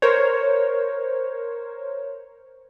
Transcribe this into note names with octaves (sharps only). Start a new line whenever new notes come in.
A#4 C5 C#5